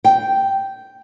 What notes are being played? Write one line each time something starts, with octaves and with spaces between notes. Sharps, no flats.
G5